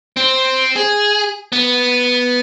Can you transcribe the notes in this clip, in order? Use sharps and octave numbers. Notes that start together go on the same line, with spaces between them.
C4
G#4
B3